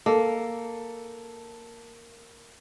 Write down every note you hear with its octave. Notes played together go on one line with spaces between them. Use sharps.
A#3 A4